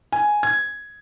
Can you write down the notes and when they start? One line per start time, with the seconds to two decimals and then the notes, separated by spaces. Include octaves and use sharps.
0.12 G#5
0.43 G#6